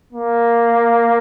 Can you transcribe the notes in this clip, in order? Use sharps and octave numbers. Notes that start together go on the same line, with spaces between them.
A#3